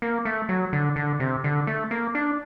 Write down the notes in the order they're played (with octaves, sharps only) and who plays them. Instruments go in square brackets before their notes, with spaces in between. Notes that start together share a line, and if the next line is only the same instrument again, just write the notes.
[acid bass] A#3
A3
F#3
D3
D3
C3
D3
A3
A#3
D4